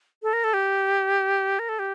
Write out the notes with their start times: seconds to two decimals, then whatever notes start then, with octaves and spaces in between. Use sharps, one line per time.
0.23 A4
0.33 A#4
0.44 A4
0.54 G4
1.59 A#4
1.69 A4
1.79 G4